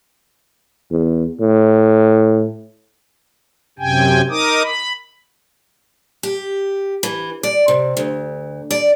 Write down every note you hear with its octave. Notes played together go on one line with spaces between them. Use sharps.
E2
A2
F#2 C3 G5 G#5
D#4 A#4 D6 D#6
B5
G4
E3
D5
C3
D2
D5